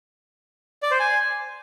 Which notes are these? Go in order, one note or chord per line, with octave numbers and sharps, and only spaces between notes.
D5
C5
G#5